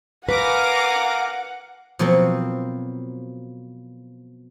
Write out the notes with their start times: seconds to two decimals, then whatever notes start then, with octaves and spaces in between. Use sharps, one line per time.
0.29 A#4 B4 F5 F#5 G#5 D6 A#6
1.99 B2 F3 F#3 A#3 C4